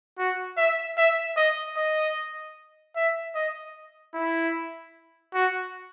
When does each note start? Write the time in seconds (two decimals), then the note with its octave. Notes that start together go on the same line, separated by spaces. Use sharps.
0.18 F#4
0.57 E5
0.97 E5
1.36 D#5
1.77 D#5
2.96 E5
3.35 D#5
4.14 E4
5.34 F#4